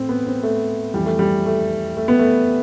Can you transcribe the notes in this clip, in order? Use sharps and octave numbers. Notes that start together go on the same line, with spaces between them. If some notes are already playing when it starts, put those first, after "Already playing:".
Already playing: A2 C4
B3
C4
A3
F2 E3 G3
A3
G3
A3
A3
B3
A3